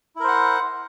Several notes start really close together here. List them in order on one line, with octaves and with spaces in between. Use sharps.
E4 A#4 C5 F#5